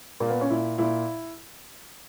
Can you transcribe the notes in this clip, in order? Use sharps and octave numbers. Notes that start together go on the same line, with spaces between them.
A#2 A#3
B3
C#4
A#2 E4
A#2 E4